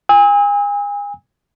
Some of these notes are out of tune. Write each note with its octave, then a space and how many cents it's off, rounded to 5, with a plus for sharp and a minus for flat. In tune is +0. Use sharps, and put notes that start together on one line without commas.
G#5 -30 E6 -45